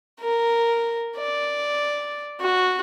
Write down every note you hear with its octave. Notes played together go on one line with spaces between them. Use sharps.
A#4
D5
F#4